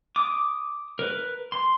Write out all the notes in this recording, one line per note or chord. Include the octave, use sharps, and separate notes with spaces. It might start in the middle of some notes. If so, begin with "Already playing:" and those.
D6 D#6
A#4 B4
C6